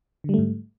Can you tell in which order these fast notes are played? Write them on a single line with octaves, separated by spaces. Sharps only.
D3 G3 A3 G#2